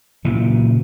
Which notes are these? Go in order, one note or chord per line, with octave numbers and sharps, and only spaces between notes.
A#2 C#3 E3 F#3